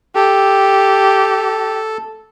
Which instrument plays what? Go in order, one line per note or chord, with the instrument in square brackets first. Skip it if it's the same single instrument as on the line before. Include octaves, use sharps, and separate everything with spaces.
[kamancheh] G4 [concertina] A4